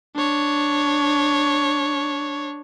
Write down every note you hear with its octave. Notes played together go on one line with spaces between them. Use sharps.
D4 C#5